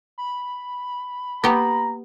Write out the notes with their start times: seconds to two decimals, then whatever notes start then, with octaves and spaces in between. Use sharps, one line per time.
0.18 B5
1.44 A#3 B3 G4 A#5